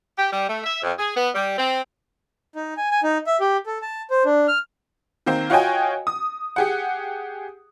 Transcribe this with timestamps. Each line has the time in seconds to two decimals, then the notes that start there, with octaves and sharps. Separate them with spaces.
0.17 G4
0.31 G3
0.49 A3
0.64 E5
0.82 F2
0.98 G#4
1.15 B3
1.35 G3
1.57 C4
2.56 D#4
2.77 G#5
2.91 G#5
3.03 D#4
3.27 E5
3.40 G4
3.66 A4
3.82 A5
4.10 C5
4.25 D4
4.48 F6
5.26 D#3 A#3 C4
5.50 F4 F#4 C#5 D#5 G5 G#5
6.07 D#6
6.56 G4 G#4 F#5